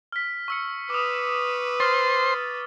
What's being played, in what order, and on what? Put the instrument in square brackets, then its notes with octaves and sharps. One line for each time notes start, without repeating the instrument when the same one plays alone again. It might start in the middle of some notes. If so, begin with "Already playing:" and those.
[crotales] F6 B6
C#6 E6 C#7
[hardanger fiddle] B4 [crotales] D6 D#6
[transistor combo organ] C5 C6 [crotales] F6 A6